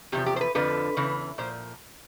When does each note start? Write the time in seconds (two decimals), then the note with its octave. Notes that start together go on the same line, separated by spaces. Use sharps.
0.12 E2 C3 F3 G4
0.26 G4
0.36 C5
0.41 B4
0.55 F2 D3 F3 B4
0.97 E2 C#3 E3
1.38 A#2 F3 C5